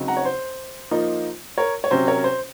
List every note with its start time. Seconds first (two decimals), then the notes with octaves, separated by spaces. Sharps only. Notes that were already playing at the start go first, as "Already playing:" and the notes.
Already playing: C#3 F#3 C4 D#4
0.08 F#5 A#5
0.17 C#5
0.25 C5
0.91 F3 A#3 D#4
1.58 A#4 C#5
1.84 C#5
1.91 C3 F#3 C#4 C5
2.07 A#4 C#5
2.24 C5